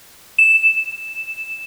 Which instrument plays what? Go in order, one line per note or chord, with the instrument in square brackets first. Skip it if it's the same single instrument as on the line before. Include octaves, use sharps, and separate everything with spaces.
[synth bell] E7